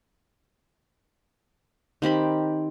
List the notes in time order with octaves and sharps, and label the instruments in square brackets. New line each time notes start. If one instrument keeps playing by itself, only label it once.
[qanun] D#3 C4 G4 B5